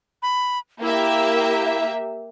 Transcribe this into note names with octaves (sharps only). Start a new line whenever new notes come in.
B5
A#3 E4 G4 E5